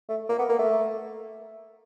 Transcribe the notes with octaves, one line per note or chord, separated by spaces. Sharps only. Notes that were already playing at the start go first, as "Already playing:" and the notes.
A3
A#3
B3
A#3
A3